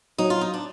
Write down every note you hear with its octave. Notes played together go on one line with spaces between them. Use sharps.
F#3 D#4
F4
D#4
D4